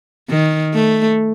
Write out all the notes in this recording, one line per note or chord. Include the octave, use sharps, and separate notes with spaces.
D#3
A3